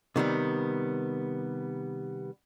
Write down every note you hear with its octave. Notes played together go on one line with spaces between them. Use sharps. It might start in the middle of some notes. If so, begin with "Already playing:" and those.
C3 D#3 G3 B3